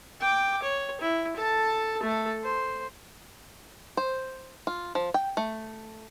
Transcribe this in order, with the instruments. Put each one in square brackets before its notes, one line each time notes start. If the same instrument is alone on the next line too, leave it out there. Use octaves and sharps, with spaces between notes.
[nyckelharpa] G5 D6
C#5
E4
A4 A5
A3 A4
C5
[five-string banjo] C5
F4
F3
G5
A3